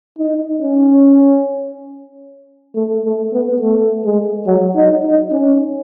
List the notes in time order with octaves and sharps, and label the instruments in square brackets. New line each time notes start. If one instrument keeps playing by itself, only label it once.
[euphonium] D#4
C#4
A3
A3
B3
A3
G#3
F#3
D#4
D#4
C#4